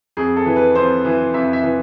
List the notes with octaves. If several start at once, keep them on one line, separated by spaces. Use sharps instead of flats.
F2 G#4
A4
E3
B4
F2 C5
E3
F2 E5
E5
E3